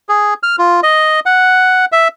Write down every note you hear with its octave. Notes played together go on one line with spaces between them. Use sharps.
G#4
F6
F4
D#5
F#5
E5